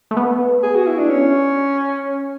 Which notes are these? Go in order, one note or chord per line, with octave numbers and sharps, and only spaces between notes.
A3
B3
G#4
F#4
E4
D4
C#4